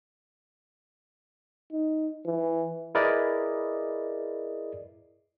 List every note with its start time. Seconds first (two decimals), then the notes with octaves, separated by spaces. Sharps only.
1.72 D#4
2.26 E3
2.95 E4 G#4 A#4 B4 D5 D#5